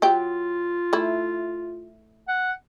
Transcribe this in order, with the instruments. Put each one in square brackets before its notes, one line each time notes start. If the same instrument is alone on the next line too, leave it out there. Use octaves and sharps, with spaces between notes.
[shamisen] F#3 G4 G5 [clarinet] F4
[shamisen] A3 E4
[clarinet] F#5